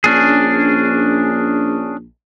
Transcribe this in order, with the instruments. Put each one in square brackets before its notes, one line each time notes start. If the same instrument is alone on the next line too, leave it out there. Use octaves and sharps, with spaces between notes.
[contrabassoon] A#1 [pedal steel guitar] C#4 D4 G#4